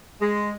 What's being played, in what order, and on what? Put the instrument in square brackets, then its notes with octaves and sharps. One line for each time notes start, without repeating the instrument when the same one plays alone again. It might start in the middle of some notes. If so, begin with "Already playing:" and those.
[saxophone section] G#3